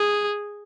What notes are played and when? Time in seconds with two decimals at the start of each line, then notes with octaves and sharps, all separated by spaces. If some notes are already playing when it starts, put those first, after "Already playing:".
Already playing: G#4